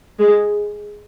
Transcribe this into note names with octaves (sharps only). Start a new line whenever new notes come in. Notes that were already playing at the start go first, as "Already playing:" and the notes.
G#3